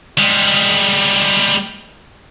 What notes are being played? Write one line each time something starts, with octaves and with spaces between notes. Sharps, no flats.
G3 G#3